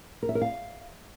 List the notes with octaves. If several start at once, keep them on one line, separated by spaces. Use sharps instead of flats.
A#4
E5
A#4
F5